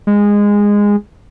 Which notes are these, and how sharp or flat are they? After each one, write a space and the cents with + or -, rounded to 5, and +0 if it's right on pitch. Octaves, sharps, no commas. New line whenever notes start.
G#3 -15